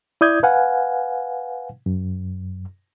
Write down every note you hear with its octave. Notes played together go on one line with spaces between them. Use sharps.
E4 D5 D#6 G6 G#6
B4 F5 F#5 G#5
F#2